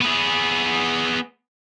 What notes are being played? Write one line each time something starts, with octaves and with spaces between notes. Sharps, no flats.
B3 G#4